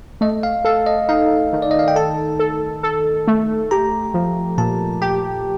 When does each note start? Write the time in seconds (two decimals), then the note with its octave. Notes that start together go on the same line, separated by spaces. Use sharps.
0.21 A3 D#5
0.43 F5
0.65 A4 F5
0.86 D#5
1.08 D#4 F5
1.53 D#3
1.62 D5
1.71 D#5
1.79 F5
1.88 G5
1.96 A4 A5
2.39 A4
2.83 A4
3.27 A3
3.71 G4 A#5
4.14 F3
4.58 A#2 A5
5.01 G4 G5